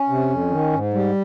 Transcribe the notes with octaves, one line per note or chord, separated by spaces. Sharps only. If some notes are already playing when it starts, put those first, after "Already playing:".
Already playing: C#4
C3
F2
D#3
G#2
G3